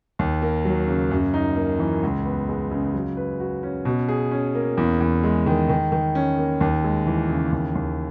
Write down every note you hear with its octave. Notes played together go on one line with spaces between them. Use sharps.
D#2
A#3
F#3
C#3
F#2
D#4
A#3
E3
C#2
B3
G#3
C#3
F#3
B4
F#4
C#4
B2
G#4
C#4
A#3
E2
E2
G#3
D#3
D#3
D#3
C#4
A#3
D#2
G#3
E3
C#3
D#2
D#2